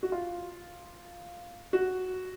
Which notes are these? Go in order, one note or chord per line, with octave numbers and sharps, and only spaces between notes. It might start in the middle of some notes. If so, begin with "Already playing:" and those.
F#4
F4
F#4